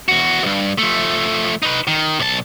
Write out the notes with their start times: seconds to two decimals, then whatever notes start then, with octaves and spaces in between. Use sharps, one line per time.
0.08 E2 F#4
0.42 E2 G2
0.78 F3 A3
1.63 D#4 B4
1.87 D#3
2.19 B1 A5